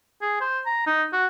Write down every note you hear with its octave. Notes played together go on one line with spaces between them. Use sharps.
G#4
C5
A#5
D#4
F#4